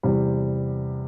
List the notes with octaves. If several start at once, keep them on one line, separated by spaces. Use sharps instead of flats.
E2 C3 G3